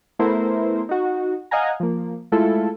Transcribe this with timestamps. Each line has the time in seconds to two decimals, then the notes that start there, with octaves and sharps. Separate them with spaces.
0.19 A3 B3 E4 A#4 C5
0.89 D#4 F#4
1.51 D#5 F5 F#5 G#5 A#5
1.80 F3 A#3
2.32 G#3 A3 E4 F4 A4